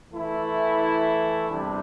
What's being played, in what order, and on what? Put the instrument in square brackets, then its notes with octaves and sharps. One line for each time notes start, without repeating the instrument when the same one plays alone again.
[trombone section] E3 A3 E4
E2 C3 G3 D4